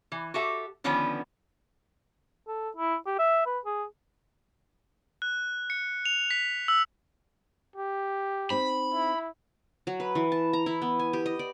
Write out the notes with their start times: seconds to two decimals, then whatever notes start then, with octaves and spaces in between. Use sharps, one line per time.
0.12 E3
0.34 F#4 G4 A4 E5
0.84 D3 D#3 F3 B3 C#4 B4
2.47 A4
2.77 E4
3.06 G4
3.19 E5
3.46 B4
3.65 G#4
5.22 F#6
5.70 C#7
6.05 F7
6.31 B6
6.68 E6
7.76 G4
8.50 C4 D#4 C5 B5
8.94 E4
9.87 F#3
10.00 B4
10.15 E3
10.32 A5
10.53 A#5
10.66 E4
10.82 B3
10.99 G#5
11.13 G4
11.26 D#5
11.39 D5